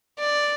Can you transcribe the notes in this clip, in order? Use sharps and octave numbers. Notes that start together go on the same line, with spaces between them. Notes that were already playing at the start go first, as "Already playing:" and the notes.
D5